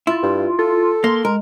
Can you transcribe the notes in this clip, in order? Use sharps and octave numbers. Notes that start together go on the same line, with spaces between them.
E4 F4
G2
F4 A4
A#3 C6
G#3 A#4